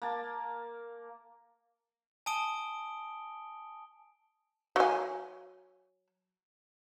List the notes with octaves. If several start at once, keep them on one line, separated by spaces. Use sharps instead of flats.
A#3 A5
G#5 A5 D#6 D7 G7
F#3 G#5